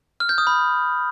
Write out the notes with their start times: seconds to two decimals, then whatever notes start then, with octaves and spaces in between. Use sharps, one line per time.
0.20 F6
0.29 G6
0.38 D#6
0.47 B5